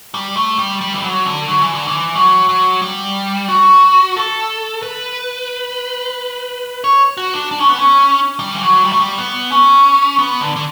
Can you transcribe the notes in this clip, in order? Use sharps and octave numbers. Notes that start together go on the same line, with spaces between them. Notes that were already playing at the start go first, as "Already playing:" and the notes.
G3
A3
G3
G3
E3
F#3
D3
F#3
E3
D3
E3
F#3
F#3
G3
F#4
A4
B4
C#5
F#4
D4
D4
C#4
B3
C#4
G3
E3
F#3
G3
A3
G3
B3
C#4
B3
D3
D3